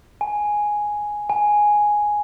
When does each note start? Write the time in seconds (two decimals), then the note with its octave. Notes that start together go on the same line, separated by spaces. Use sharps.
0.21 G#5
1.30 G#5